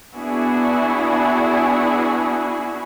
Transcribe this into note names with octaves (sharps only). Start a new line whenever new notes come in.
B3 D4 E4 F#4 G#4